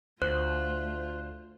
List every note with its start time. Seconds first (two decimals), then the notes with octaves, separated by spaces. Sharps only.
0.22 D2 A3 F4 C5 F#6